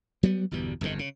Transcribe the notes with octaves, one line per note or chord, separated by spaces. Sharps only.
F#3 G3 B3
G1 E2 B2 G3
G1 F2 A2 D#3
C#3